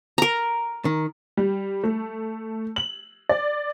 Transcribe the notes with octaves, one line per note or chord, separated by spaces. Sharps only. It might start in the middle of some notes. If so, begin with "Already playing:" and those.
A#4 A#5
D#3
G3
A3
F#7
D5